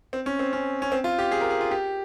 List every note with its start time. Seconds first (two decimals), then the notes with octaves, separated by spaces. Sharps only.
0.13 C4
0.26 C#4
0.39 C4
0.53 C#4
0.82 C#4
0.92 C4
1.04 F4
1.19 G4
1.32 G#4
1.41 A#4
1.50 G#4
1.61 F4
1.71 G4